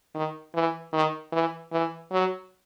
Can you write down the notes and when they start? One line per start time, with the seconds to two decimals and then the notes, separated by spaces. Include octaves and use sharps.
0.15 D#3
0.55 E3
0.93 D#3
1.32 E3
1.72 E3
2.12 F#3